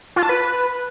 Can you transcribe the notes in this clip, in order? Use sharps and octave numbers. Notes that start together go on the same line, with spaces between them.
F4
A5
B4